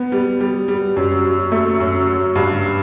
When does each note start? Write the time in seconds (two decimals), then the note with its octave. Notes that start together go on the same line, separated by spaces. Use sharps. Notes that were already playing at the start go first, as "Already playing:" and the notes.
Already playing: B3
0.12 G3
0.40 G3
0.68 G3
0.96 F#2
1.24 F#3
1.52 A3
1.80 F#2
2.07 F#3
2.35 G2